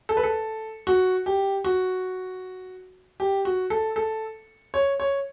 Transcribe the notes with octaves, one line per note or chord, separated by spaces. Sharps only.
A4
B4
A4
F#4
G4
F#4
G4
F#4
A4
A4
C#5
C#5